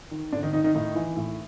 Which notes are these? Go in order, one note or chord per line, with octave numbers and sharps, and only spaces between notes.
D#3
G#2 D3 D4
D#3 D#4
D#3 D#4
D#3 D#4
A2 D#3 D#4
E3
A2